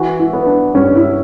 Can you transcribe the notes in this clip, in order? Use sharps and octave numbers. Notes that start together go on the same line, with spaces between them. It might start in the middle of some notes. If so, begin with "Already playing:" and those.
Already playing: E3 F#4
E4
B3
D4
G2 C#4
E4